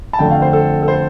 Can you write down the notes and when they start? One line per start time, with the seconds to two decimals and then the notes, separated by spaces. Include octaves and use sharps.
0.13 A5
0.19 F2 D3 A3 G5
0.31 F5
0.42 C5
0.53 A4
0.83 A4
0.88 C5